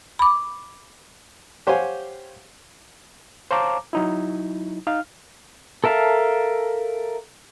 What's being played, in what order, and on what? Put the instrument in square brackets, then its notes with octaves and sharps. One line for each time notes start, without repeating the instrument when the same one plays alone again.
[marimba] B5 D6
[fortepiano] G4 C5 C#5 F5 F#5 G#5
[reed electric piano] C5 C#5 F5 A5 A#5 D6
F#3 D#4 E4
D#4 F5 F6
[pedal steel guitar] A4 A#4 E5 F5 A5